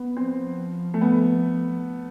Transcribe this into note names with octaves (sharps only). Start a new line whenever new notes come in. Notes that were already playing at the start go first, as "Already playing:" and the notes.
Already playing: B3
F3 C4
A3
B3